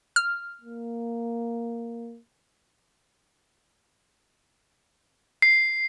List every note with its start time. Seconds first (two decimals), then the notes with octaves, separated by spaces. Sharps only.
0.16 F6
0.61 A#3
5.42 C7